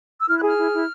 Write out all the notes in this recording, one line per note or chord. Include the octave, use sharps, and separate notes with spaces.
E6
E4 F6
F#6
G#4
F6
E4
E4